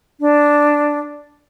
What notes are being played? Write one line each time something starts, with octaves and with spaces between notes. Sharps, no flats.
D4